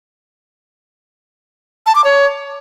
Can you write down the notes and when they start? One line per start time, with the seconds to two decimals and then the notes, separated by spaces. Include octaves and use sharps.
1.86 A5
1.95 D6
2.04 C#5